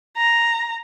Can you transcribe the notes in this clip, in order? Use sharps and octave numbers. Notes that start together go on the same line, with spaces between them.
A#5